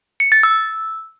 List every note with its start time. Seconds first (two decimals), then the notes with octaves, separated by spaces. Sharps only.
0.20 C#7
0.32 A6
0.43 E6